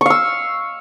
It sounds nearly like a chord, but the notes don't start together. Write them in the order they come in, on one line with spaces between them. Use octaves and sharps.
C#6 F5 E6